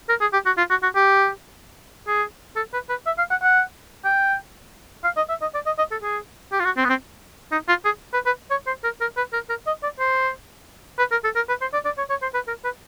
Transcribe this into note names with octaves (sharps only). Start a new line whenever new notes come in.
A#4
G#4
G4
F#4
F4
F#4
F#4
G4
G#4
A4
B4
B4
E5
F5
F#5
F#5
G5
F5
D#5
E5
D#5
D5
D#5
D#5
A4
G#4
G4
F4
F#4
C4
B3
C4
D#4
F4
G#4
B4
B4
C#5
C5
A#4
A#4
B4
A#4
A#4
D#5
D5
C5
B4
A#4
A4
A#4
B4
C5
D5
D5
C#5
C#5
C5
B4
A#4
B4